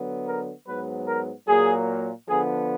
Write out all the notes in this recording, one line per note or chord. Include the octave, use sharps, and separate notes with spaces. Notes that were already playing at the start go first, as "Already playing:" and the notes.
Already playing: D3 F#3 B3
A#4
G#2 F#3 B3 B4
A#4
A#2 F#3 A#3 G#4
D3 F3 B3 G#4